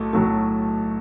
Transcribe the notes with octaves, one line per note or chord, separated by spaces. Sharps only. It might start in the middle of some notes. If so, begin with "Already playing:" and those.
Already playing: B1 A2 F#3 A3
B1 A2 F#3 A3